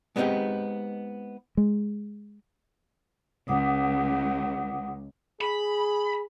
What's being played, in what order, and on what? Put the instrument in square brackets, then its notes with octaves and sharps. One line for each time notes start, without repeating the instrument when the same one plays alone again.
[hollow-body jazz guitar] G#3 B3 C4 D4 D#4 G4
[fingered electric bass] G#3
[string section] C#2 [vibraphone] F#5 D6 D#6
[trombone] G#4 [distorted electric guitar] B5